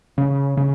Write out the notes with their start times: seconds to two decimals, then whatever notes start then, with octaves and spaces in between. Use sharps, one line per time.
0.18 C#3
0.57 C#3